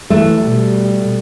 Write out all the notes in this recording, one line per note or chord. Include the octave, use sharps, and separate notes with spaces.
E3 A3
B2 G3